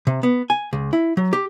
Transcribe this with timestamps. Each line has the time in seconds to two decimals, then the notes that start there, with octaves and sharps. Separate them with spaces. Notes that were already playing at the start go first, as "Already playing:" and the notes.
0.07 C3
0.23 B3
0.50 G#5
0.73 C#2
0.93 E4
1.17 F#3
1.33 G4